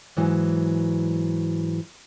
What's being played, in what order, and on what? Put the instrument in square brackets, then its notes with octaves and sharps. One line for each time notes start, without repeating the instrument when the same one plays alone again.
[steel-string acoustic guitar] G#2 E3 F#3